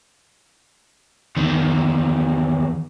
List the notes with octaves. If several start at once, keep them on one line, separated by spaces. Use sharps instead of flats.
E2 D#3